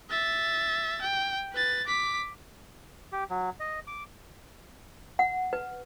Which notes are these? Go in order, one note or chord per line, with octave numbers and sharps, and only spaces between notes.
E5 A6
G5
B4 A6
D6 B6
G4
F#3
D#5
D6
F#5
B4